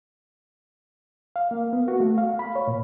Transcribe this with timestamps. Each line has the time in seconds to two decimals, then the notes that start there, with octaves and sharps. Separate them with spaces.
1.36 F5
1.51 A#3
1.73 B3
1.88 F#4
2.00 A3
2.18 F5
2.39 B5
2.56 C#5
2.67 A#2